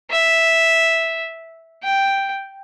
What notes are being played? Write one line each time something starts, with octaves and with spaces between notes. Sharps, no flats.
E5
G5